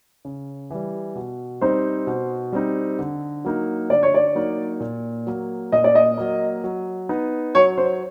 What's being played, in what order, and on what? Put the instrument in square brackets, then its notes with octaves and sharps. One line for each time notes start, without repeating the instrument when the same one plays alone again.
[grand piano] C#3
E3 G3
B2
[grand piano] G3 C4 D#4 [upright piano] C5
[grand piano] B2
G3 C4 D#4
D3
F#3 A#3 D#4
[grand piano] D3 [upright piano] D5
[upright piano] C#5
D5
[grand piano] F#3 A#3 D#4
A#2
F#3 A#3
[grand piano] A#2 [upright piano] D#5
[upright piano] D5
D#5
[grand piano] F#3 A#3
F#3
B3 D#4
[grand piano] F#3 [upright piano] C#5
[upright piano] C5